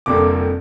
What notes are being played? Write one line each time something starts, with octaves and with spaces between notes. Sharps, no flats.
F1 F2 D3 G3 A#3 D6